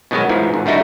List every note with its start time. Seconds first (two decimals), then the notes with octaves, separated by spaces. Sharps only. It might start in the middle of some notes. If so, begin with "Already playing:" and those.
0.11 B2 D#3 F#3 G#3 B3
0.29 G#2 E3 F3
0.54 G#1
0.66 D3 G3 A3 D#4 E4 F#4